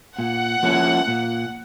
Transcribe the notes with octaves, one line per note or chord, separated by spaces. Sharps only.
A#2 F#5
F3 A#3 C#4 E4
A#2